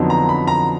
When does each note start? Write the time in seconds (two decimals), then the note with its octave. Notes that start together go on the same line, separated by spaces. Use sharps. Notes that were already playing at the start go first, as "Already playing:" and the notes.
Already playing: F2 D3 F#3 B3 D#4
0.10 A#5
0.29 B5
0.47 A#5